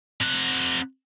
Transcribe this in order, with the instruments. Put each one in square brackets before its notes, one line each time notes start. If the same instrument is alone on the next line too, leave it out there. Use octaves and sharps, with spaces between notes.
[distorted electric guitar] C3 F#5